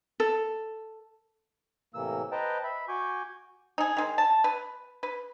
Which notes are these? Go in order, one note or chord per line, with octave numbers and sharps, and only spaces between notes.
A4
A2 C3 E3 A#3 E6
B4 C5 D#5 G5 A5 A#5
E5 B5
F#4 G#5 C#6 D6 G6
D#4 G#4
D#3 G#3
A5
B4
B4